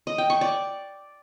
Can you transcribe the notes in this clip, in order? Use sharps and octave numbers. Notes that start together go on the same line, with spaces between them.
D#5
G5
C#6
D5